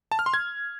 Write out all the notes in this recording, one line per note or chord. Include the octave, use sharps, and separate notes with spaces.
A5
F6
C6
G#6